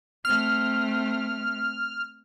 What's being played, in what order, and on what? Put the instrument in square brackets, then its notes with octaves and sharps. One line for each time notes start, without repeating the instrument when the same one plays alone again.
[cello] A3 C4 [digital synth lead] F6